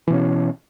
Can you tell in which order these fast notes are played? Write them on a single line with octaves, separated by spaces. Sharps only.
E3 B2 C#4